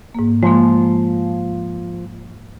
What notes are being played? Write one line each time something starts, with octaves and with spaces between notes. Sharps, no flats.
G#2 A#3
F3 G#3 A#3